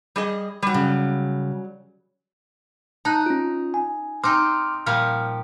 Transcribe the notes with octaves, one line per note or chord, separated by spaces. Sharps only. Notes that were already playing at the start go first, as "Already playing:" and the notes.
G3 G#4 D#5
F#3 G3
C#3
D#4 A5 F#6
C#4 F4
G#5
C4 D#4 C6 D6 F6
A#2 F3 G3 F6